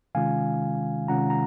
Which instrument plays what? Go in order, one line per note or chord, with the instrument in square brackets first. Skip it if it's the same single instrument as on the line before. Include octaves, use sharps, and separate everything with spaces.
[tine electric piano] C3 D#3 G#3 C#4 F4 F5 G#5
C3 D#3 G#3 C#4 F4 F#5 A#5
A#5